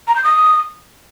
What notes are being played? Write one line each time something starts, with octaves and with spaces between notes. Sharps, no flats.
A#5
G6
D#6